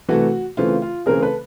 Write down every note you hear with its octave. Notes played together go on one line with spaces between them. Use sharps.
C3 E3 A3 F#4
C#3 E3 A3 C4 F4
F4
C#3 E3 A3 C4 G#4 A#4
A4 B4